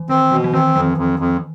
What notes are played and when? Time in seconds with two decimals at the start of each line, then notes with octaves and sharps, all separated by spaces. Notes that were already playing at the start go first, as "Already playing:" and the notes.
Already playing: E3
0.09 D#3 C4
0.31 B2 E3
0.44 E3
0.53 D#3 C4
0.76 F2 E3
0.97 F2
1.19 F2